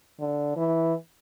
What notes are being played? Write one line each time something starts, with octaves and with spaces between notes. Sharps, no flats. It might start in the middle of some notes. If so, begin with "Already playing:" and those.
D3
E3